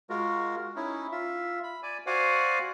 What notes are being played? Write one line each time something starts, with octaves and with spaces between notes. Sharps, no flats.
G#3 F4 F#4 A#4
C#4 D#4 E4
F4 E5
B5
D5 G#5
F#4 C5 D5 F5 F#5 G#5